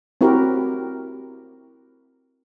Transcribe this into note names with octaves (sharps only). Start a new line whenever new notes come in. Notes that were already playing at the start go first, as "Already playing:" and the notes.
C4 E4 F#4 G4 A#4